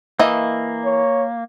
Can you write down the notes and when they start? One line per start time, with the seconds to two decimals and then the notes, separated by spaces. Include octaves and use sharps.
0.19 E3 A#3 D#5 E5
0.84 C#5